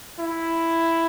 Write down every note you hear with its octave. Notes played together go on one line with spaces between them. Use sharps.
E4